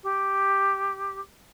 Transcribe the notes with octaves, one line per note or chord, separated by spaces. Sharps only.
G4